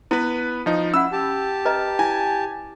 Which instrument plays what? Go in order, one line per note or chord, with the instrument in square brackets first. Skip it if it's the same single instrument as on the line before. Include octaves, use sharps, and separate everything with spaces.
[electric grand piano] B3 B4 [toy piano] E4
[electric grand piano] F3 D#4
[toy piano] C#4 F#5 [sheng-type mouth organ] E4 [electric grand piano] E6
[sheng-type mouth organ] G4 A5
[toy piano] B4 D#5 A#5
[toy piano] E4 [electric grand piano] G#5